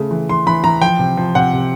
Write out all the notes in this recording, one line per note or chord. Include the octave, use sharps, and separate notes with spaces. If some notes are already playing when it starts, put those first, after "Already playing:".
Already playing: C#3 A3
E3
E3 C6
E3 B5
E3 A#5
F3 G5
C3
F3
C3 F#5
C3